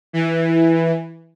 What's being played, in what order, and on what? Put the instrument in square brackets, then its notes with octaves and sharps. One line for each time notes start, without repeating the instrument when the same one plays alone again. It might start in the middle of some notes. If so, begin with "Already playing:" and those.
[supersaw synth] E3